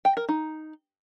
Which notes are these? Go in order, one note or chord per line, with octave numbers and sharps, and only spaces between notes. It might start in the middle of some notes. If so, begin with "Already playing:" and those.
G5
A#4
D#4